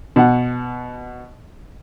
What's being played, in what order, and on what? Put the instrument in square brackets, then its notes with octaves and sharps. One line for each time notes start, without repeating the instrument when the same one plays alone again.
[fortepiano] B2 F#5